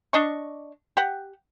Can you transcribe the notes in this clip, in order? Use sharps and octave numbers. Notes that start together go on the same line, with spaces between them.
D4 D#5 C#6
G4 F#5